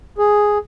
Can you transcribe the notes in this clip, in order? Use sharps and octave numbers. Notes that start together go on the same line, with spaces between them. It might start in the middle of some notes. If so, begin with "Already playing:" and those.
G#4